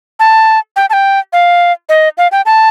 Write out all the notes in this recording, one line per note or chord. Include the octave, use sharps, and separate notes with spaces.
A5
G5
A5
G5
F5
D#5
F5
G5
A5